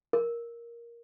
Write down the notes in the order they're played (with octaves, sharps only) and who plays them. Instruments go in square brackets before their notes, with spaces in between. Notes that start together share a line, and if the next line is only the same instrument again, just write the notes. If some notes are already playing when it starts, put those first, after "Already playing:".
[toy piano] A#4